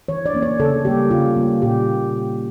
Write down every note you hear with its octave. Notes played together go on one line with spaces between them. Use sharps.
E3 C#5
D5
A#3 C#4
C#5
C#3 A4
G3 A#3 C#4 G4
C#3 F4
G3 A#3 C#4
A#2 G4